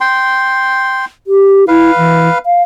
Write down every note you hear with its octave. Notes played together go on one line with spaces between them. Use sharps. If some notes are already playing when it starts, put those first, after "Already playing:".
G5 C6
G4
E4 B4 F5
E3
F5